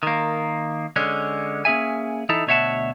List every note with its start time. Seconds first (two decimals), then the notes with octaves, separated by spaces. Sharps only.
0.03 D#3 A#3
0.96 D3 G#3 C#4
1.65 A#3 C#4 G#4 E5 G#5
2.29 E3 D#4 E4 A4
2.47 D2 B2 C#5 E5 F#5 A5